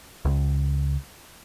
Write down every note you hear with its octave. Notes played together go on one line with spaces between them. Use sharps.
C#2